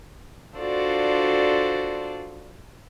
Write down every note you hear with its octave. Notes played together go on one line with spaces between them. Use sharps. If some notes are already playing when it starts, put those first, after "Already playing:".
D4 F4 F#4 A4 C5 D5